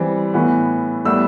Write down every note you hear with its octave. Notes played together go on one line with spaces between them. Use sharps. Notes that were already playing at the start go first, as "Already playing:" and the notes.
Already playing: E3 G3 C4
A2 E3 B3
A2 G3 B3 E6